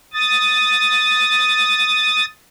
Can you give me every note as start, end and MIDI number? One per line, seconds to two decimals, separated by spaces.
0.14 2.25 87
0.14 2.25 93